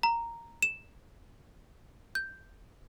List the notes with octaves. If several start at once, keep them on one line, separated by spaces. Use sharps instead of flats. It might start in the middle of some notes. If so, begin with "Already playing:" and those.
A#5
E7
G6